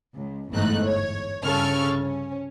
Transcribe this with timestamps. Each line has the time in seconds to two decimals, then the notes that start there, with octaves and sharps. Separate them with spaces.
0.16 C#2
0.51 G1 E2 G#2 A3 D#4 F#6
0.83 C#5
1.43 C2 G2 C#3 A4 C#6 F6
2.00 C#4